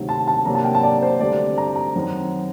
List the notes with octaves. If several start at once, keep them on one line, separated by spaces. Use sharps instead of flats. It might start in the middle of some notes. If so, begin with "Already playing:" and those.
Already playing: D2 C3 D#3 F#3
A5
A5
C3 F#3 A#3 D4 A#5
A5
G5
A5
D5
C5
D2 D3 G3 C4 D5
A#5
A#5
F#2 D#3 F#3 C4